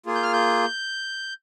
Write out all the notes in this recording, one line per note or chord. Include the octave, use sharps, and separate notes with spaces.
A#3 F4 G#4
G6
F6
G6